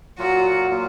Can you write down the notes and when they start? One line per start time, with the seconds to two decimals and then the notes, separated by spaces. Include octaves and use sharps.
0.18 A#2 F#3 A#3 F4 F#4
0.70 A#2 F#3 A#3 F4